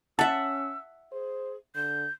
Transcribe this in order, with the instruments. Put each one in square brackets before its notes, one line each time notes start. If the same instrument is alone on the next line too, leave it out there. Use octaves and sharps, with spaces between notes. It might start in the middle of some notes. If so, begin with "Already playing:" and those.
[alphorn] C#4 [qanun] E5 F#5 [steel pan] A5 [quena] E6
[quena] G#4 [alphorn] C5
[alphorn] D3 [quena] G6